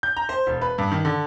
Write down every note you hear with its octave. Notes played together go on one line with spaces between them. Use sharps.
G6
A#5
C5
E1
B4
G2
D#3
D3